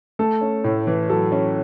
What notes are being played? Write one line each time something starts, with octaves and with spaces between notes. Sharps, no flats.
A3 A4
C#4
A2
E3
F#3 A4
C#4